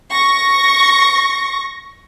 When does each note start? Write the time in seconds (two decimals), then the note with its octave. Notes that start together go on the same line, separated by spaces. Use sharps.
0.12 C#6 A#6